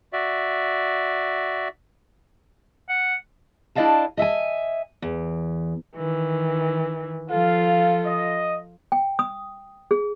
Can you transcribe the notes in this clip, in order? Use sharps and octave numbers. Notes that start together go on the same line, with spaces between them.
F#4 D5 E5
F#5
D4 E4 D5 D#5 F5 A5
D#5 E5 F#5 G#5
E2
D#3 E3
F3 F4 A4 F5
D#5
G5
D#6
G#4